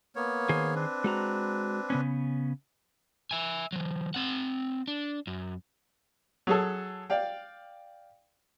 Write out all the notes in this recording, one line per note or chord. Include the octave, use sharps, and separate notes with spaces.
A#3 B3 C#5
D#3 G#4 C5
C4 D4 B4
G#3 F#4 A#5
C#3 B3 C#4
E5 G#5
E3 F#3
C4 F#5
D4
F#2
F#3 G#4 A4
D5 F5 G5